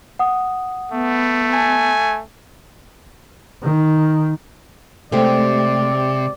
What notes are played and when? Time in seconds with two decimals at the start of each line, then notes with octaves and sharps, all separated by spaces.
0.19 F#5 D#6
0.92 A3 B3
1.54 G#5 A5
3.63 D#3
5.12 C3 G#3 A3 C4 G4 D5